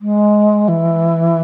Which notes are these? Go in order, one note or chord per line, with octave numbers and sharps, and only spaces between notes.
G#3
E3